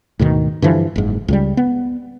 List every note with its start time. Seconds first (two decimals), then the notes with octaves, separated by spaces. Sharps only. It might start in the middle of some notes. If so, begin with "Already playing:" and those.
0.19 D2 G#2 B2 D#3
0.62 G2 D3 E3 F3
0.96 F#1 G#2
1.28 C#2 C#3 G3
1.57 B3